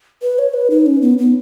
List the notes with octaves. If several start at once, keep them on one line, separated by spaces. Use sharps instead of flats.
B4
C#5
B4
D#4
C#4
B3
B3